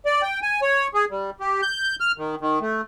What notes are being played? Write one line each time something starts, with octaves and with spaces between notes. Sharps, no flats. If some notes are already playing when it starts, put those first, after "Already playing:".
D5
G5
G#5
C#5
G#4
G3
G4
G6
F6
D#3
D#3
A3